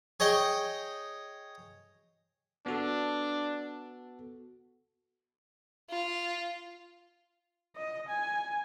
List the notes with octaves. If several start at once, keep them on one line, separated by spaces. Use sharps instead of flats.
G#4 C#5 D#5 G5
B3 D4 F#4 A4
F4
D#5
G#5